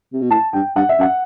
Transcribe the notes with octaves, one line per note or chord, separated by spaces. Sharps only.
C3
B2
A2 A5
G2 G5
G2 F#5
E5
F#2 F#5